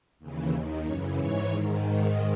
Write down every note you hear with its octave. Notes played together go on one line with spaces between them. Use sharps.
D#2 C#3 E3
D#2 D#3
F#2 C#3 E3 C#5
G#2 E3 C#5
G#2 D#3